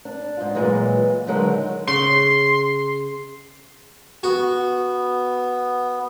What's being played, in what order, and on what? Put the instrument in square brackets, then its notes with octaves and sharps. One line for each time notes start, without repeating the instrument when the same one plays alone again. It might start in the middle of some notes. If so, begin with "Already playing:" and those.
[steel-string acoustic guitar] D4
G#2 F4
A#2 E3 F#3 G#3
D3 D#3 F#3 G#3
[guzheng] C#3 [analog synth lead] C6
[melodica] B3 [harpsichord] F#4